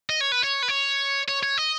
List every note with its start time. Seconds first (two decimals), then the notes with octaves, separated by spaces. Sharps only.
0.10 D#5
0.21 C#5
0.32 B4
0.44 C#5
0.63 B4
0.69 C#5
1.28 C#5
1.43 C#5
1.58 D#5